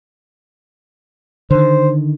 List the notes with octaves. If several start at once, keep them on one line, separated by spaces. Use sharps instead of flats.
D3 D#3 C5